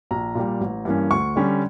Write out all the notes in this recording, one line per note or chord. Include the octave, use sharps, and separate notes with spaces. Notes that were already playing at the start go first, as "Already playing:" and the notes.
A#1 A#5
A#2 G3
A1
G2 E3 A#3 C#4
D2 C#6
D3 G3 C#4